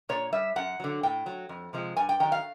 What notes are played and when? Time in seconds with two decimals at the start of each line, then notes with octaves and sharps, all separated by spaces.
0.09 A#2 C#5
0.32 G3 E5
0.56 F#2 F#5
0.80 D3 F#3
1.03 A2 G5
1.26 F#3
1.49 F2
1.73 C3 F3 G#3
1.97 G2 G#5
2.09 G5
2.20 D#3 F#3 G5
2.32 F5